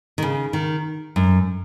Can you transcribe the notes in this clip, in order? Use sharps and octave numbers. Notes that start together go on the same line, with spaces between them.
D#3
C#3
D#3
F#2